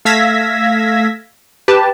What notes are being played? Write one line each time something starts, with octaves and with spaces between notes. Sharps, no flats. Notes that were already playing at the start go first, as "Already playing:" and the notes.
A3 F5 E6 G#6 A#6 B6
G4 B4 A5